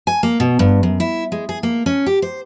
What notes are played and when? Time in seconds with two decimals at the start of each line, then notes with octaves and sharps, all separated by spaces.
0.07 G#5
0.23 A#3
0.40 B2
0.59 G2
0.83 F#2
1.00 E4
1.32 G#3
1.49 G#4
1.63 A#3
1.86 C#4
2.06 G4
2.22 C5